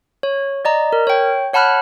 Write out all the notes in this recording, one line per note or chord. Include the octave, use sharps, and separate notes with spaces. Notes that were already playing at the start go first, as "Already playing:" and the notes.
C#5
D5 D#5 A#5
A#4
C#5 G5
C#5 F#5 A5 B5 F6 F#6